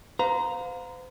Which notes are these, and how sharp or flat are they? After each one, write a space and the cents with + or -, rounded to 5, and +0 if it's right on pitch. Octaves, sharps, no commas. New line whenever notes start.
C5 -40 F5 +30 A#5 +0